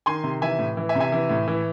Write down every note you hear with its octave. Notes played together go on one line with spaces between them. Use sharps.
D#3 G#5 C6
C3
E3 E5 G#5
A2
E3
E5 G#5
C3
E5 G#5
E3
A2
E3